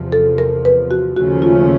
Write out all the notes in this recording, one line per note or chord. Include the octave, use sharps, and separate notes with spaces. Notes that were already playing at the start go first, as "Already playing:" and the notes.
Already playing: E2 C3 F3
A4
A#4
B4
F#4
D#2 C#3 F3 A3 C#4 F#4
F4